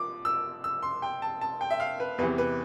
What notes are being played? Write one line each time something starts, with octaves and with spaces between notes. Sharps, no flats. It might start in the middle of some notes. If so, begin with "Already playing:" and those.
Already playing: F3 D6
E6
E6
C6
G5
A5
A5
G5
E5
F5
B4
E2 C3 E3 B4
B4